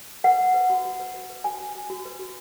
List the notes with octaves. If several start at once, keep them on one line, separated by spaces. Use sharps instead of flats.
B4 F#5
B4
B4
F#4
F#4
B4
B4
B4
F#4 G#5
F#4
F#4
F#4
B4
F#4